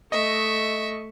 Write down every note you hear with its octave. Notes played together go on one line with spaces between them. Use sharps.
A3 D#5 E5 C#6